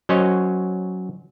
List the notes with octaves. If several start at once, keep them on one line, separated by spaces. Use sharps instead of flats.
F#3 C#4 C5 C#5 D#5